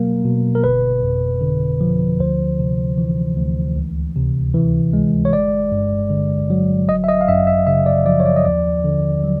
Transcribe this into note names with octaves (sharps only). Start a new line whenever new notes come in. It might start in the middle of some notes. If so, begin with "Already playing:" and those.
Already playing: B2 F#3 A#3 A#4
B2
A#4
G1 B4
F2
D3
F3
D2 C5
C3
E3
D2
C#2
C3
E3
G#3
C#5
G1 D5
G2
D3
F#3
G1 D#5
E5
D#5
F5
F#2 E5
E5
C#3 E5
D5
F3 D5
C#5
D5
D#5
D#2 D5
D3
F#3